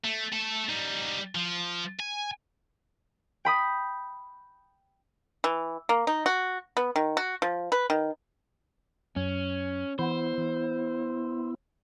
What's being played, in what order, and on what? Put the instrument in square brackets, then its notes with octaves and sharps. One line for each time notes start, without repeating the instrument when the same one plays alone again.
[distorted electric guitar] A3
A3 A4
G3 D#4
F3
G#5
[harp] G5 B5 D#6
[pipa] E3
A#3
D#4
F#4
B3
D#3
F#4
F3
B4
D#3
[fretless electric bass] F#2 [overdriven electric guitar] C#4
[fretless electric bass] E3 [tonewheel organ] B3 E4 [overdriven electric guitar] C5
[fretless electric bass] E3